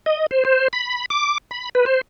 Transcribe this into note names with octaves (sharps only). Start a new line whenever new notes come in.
D#5
C5
C5
B5
D6
B5
B4
C5